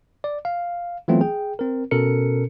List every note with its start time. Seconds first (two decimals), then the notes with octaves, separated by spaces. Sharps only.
0.24 D5
0.45 F5
1.08 E3 F#3 A3 B3 C4 F4
1.21 G#4 G5
1.59 C4 A#4
1.91 B2 C#4 A4 A#4 C#7